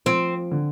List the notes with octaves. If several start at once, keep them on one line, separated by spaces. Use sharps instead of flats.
F3 C4
D3